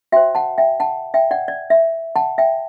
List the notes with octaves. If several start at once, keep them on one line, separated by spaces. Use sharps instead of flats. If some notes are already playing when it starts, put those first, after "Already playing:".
F#4 C5 E5 G5
F#5 A5
E5 G5
F#5 A5
E5 G5
D5 F#5
D5
E5
F#5 A5
E5 G5